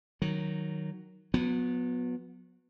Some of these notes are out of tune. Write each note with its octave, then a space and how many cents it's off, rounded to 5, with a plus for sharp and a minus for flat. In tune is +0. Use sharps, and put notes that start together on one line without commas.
D#3 -5 F#3 +0
F#3 -35 B3 +0